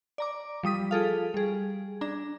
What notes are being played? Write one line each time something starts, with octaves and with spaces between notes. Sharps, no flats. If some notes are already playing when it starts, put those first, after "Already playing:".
D5 A#5 D6
F3 G3 D#6 B6
F4 G#4 A4 F5
G3 G#4
D4 A#5